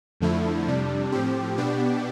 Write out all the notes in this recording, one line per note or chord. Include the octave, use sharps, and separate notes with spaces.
F2 D3 F3 A3 E4
F2 C3 G3 D4
A2 F3 C4 G4
B2 B3 D4 G4